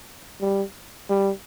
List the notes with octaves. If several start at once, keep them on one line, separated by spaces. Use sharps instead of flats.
G3
G3